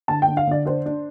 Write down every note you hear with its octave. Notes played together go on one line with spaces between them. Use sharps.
D3 A5
G5
D3
F5
D3 D5
D4 C5
D4